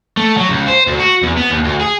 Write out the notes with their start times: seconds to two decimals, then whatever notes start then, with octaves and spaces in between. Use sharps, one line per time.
0.17 A3
0.37 F#3
0.49 C#2
0.68 C5
0.88 D2
1.00 F#4
1.23 E2
1.37 B3
1.50 D#2
1.65 D2
1.81 G#4